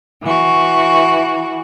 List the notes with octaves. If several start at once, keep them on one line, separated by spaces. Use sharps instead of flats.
E3 F#4